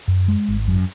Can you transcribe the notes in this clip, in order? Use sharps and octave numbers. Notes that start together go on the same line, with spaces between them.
F#2
G#3
G#1
F#2